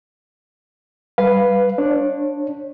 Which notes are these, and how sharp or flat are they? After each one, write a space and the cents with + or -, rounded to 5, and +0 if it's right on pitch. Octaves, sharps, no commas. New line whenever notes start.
G3 -5 B4 +0 F5 +0
D4 +0 C#5 -30